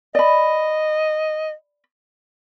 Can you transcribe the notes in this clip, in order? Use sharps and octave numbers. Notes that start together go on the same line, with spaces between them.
D5 D#5 B5